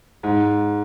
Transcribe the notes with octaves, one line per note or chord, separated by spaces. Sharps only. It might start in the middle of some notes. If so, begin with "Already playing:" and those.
G#2